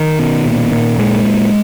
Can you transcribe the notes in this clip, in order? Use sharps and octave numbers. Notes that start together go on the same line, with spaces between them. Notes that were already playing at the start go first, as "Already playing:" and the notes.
Already playing: D#3
B2
A#2
A#2
A#2 G#3
A#2